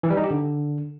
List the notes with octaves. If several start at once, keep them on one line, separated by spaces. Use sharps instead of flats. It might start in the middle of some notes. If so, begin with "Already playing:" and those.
E3
G3
D#4
G4
D3